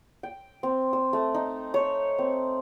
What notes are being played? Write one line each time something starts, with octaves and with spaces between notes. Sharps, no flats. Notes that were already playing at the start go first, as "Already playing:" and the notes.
G5
C4
E6
A3
D#4
C#5
C4